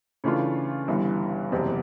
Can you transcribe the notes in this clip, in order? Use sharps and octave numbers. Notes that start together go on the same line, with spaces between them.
C#3 E3 A3 D4 F4
G1 G2 E3
F#1 E2 C3